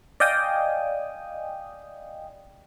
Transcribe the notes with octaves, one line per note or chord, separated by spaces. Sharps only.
D5 D#5 F5 G5 G#5 D#6